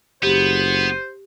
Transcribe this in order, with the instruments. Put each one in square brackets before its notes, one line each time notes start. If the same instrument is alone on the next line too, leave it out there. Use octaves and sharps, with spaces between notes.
[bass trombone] F#1 [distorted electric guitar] B3 [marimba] G4 [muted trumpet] C5